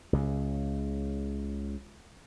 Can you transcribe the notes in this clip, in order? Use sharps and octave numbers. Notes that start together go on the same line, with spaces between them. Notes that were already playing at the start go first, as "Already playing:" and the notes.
C#2 C#3